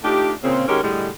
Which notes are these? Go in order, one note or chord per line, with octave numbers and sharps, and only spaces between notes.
A3 D4 D#4 F4 G4
A#2 C#3 C4
D#3 G#3 C#4 F#4 G4 A#4
A2 D3 G3 G#3